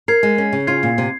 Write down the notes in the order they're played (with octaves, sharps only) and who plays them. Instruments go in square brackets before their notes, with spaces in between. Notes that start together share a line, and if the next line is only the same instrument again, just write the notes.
[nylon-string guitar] A#4 [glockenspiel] G#6 C7
[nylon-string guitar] G#3
C#4
C#3
[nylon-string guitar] F4 [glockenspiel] G#6 C7
[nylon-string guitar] A#2
C3